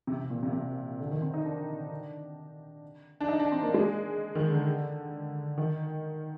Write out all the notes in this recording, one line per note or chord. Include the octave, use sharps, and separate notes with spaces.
C3
C3
A#2
C3
C3
D3
D#3
C4
D#4
D4
D4
D#4
D4
C4
A#3
G#3
D#3
D3
D#3